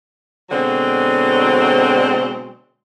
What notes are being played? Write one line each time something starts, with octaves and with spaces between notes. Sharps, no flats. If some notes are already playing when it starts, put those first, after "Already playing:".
B2 D3 F#3 G#3 C4